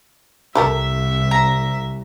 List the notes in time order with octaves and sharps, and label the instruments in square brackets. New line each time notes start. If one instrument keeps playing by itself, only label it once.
[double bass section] C2 [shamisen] G4 A4 A#4 [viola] E5
[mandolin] A#5